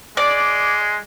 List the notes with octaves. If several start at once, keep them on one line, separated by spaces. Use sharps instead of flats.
G#3 D5